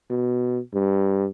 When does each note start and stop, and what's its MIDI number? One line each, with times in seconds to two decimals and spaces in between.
0.10 0.59 47
0.74 1.27 43